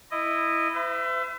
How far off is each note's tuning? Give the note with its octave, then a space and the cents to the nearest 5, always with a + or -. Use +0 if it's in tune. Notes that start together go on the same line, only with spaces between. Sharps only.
E4 +0 D#5 -15
C5 -45 E5 +25